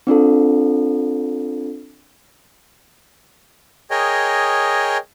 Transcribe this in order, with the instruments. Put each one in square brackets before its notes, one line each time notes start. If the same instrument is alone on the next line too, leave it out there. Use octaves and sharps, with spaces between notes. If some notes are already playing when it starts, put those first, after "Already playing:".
[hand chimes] C4 D4 F4 A4
[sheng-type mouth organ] G#4 A#4 C#5 D#5 G5